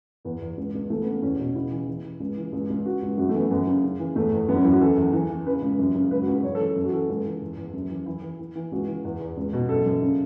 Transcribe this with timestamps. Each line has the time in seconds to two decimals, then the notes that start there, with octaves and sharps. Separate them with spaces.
0.25 E2 B3
0.42 E2
0.57 C#2
0.74 C#2
0.90 E3 A3
1.02 B3
1.06 C#3
1.12 B3
1.22 E2 C#4
1.39 B2
1.55 C#3 E4
1.71 E3
1.87 E3
2.04 E3
2.20 C#2
2.37 E3
2.52 C#2
2.70 C#2
2.85 C#3 F#4
3.02 C#2
3.17 F#2 F#4
3.29 A3
3.35 E3 B3
3.51 F#2 B3
3.67 C#3
3.84 C#3
3.99 E3
4.16 E2 A3
4.32 E2
4.48 F#2 B3
4.56 C#4
4.64 F#2 E4
4.72 F#4
4.81 E3 A4
4.97 E2
5.13 E3
5.30 E3
5.46 C#3 B4
5.62 C#2
5.79 F#2
5.95 C#3
6.11 C#2 B4
6.21 F#4
6.28 C#2
6.33 B4
6.43 F#2 C#5
6.55 A4
6.59 E3
6.65 A4
6.76 F#2 A4
6.85 F#4
6.92 E3 A4
7.09 C#2
7.25 E3
7.42 E2
7.58 E2
7.74 F#2
7.90 E3
8.06 E3 E4
8.22 E3
8.39 E3
8.55 E3
8.72 C#2 F#4
8.88 E3
9.05 E2
9.21 E2
9.37 C#2
9.53 B2
9.69 F#2 A4
9.86 F#2
10.02 C#3